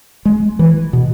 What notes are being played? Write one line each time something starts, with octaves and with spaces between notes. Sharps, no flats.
G#3
E3
B2